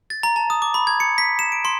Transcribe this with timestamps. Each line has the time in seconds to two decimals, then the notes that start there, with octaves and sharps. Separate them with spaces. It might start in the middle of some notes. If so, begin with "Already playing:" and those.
0.10 A6
0.23 A#5
0.36 A5
0.50 D#6
0.62 D6
0.74 B5
0.87 G#6
1.00 C#7
1.18 B6
1.39 E7
1.52 D7
1.65 C6